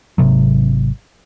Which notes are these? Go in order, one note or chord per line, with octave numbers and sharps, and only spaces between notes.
G#1 C#2 C3 F#3